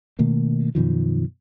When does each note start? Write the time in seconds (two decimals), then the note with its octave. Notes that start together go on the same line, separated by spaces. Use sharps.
0.19 B2 D#3 A3 A#3
0.75 F#2 B2 D#3 F3